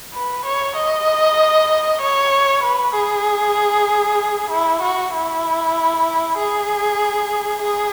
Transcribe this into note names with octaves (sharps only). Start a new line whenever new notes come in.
B4
C#5
D#5
C#5
B4
G#4
E4
F#4
E4
G#4
G#4